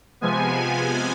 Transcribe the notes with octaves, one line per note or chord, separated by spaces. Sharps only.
C3 F3 G#3 B3 G#5